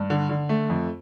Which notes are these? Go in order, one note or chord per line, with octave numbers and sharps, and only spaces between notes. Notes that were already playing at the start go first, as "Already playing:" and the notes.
Already playing: G2
D3
D3
A3
F2